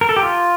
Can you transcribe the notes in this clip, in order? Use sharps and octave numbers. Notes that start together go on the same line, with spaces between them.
A#4
A4
G4
F4